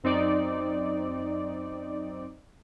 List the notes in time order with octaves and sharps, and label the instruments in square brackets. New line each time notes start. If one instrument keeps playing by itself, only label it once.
[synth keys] F#2 C4 D#4 D5